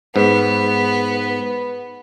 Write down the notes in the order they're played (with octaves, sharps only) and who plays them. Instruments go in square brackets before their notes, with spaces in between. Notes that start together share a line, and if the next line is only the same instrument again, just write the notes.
[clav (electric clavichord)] G#2 [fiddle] B3